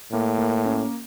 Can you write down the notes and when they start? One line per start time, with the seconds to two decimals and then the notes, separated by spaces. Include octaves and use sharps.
0.12 A2 A#3
0.39 A#3
0.65 C#4